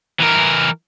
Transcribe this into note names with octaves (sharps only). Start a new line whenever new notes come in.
E3 A#4